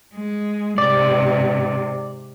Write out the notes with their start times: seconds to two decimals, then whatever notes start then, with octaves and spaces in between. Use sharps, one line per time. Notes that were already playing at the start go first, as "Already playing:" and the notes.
0.14 G#3
0.78 G#2 C3 D5